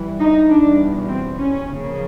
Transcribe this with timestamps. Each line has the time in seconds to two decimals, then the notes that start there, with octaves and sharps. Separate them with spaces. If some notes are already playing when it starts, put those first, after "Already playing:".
Already playing: E3 G3
0.20 D#4
0.49 E2 B2 G3 D4
1.09 C4
1.39 C#4
1.69 C#3 F3 A#3